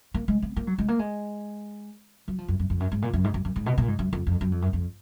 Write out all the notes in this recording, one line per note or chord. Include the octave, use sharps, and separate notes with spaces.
A#3
G#3
B3
A#3
F#3
G#3
A#3
G#3
F#3
F3
F#2
F#2
F2
F#2
G#2
A#2
F#2
G#2
F#2
F#2
G#2
B2
A#2
G#2
F#2
F2
F2
F#2
F2
F#2
F2